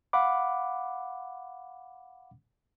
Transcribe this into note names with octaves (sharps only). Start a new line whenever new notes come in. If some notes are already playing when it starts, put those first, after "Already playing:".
F5 F#5 B5 D6